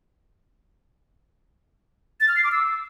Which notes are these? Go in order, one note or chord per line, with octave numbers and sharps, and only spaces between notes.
A6
F6
C7
D6
E6